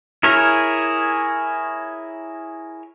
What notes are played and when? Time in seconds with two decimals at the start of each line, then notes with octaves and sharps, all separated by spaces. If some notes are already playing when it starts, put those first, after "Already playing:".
0.23 E4 G#4 A#4 C#5